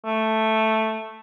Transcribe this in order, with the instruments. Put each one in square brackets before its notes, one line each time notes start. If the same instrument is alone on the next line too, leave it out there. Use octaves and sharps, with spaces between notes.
[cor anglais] A3